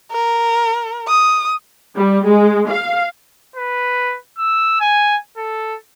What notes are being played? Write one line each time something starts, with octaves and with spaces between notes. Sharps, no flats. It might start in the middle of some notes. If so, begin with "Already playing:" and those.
A#4
D#6
G3
G#3
F5
B4
E6
G#5
A4